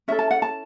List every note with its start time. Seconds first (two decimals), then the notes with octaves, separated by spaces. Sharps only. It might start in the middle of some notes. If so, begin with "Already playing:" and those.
0.08 C#4 E4 A4 E5
0.19 A5
0.31 F#5
0.42 A5